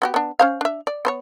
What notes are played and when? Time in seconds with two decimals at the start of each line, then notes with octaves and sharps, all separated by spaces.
0.02 B3 F#4 G4
0.14 B3 D4
0.39 C#4 C5 F5
0.61 D4 E5
0.87 D5
1.05 B3 C5 C#5